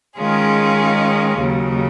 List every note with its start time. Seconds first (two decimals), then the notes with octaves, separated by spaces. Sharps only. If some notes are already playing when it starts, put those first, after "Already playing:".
0.18 D#3 G#3 C#4 F4 G#4
1.40 D#2 C#3 F#3